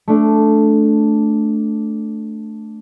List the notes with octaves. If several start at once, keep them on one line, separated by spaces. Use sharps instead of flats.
A3 D4